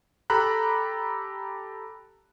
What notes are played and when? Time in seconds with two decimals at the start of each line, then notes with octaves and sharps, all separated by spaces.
0.30 G4 A4 A#5 B5 F#6